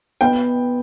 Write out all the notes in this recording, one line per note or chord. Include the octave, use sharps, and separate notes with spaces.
B3 G5